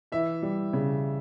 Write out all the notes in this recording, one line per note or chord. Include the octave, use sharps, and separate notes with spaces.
E3 E5
G3
C#3